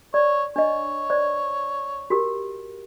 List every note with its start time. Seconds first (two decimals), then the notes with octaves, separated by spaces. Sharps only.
0.14 C#5 D5
0.56 D4 C#5 D#5
1.10 C5 D5
2.10 F#4 G4 A#4